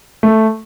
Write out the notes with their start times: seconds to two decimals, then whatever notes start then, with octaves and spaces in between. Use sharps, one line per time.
0.23 A3